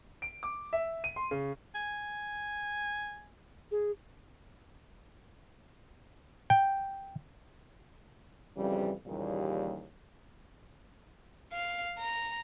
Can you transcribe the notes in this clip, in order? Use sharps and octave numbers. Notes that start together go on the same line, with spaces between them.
D7
D6
E5
D#7
C6
C#3
G#5
G#4
G5
F2 C#3 E3 G3
D#2 A#2 C#3 E3 G3
F5
A#5